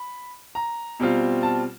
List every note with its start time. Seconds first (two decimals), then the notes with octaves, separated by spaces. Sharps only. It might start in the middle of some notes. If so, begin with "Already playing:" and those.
Already playing: B5
0.55 A#5
0.99 B2 G3 C4 F4
1.43 A5